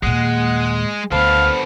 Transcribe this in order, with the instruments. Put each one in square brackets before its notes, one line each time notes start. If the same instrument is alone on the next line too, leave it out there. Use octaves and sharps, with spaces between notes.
[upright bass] D#2 A#2 [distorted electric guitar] G#3 [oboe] F#5
[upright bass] D2 [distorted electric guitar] D3 B3 [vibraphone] C5 A5 B5 [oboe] F5